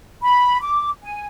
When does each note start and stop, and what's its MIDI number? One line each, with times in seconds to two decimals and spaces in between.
0.23 0.58 83
0.62 0.90 86
1.02 1.28 80